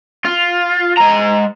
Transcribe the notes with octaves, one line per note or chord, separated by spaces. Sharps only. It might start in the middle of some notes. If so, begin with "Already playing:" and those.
F4
G#3 A#5